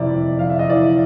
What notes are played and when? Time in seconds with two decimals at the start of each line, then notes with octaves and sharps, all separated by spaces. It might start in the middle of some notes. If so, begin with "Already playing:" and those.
Already playing: F2 C3 E3 D5
0.11 F2
0.39 F2 F5
0.50 E5
0.59 D#5
0.69 E3 D5